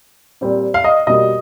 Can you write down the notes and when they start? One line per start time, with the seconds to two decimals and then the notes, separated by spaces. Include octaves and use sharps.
0.41 A#2 G3 C4
0.74 F5
0.84 D#5
1.07 B2 G3 A#3 D#5